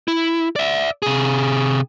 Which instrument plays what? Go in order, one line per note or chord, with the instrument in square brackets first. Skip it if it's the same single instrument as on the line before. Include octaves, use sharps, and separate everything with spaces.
[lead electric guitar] E4
D5 E5
C3 G#4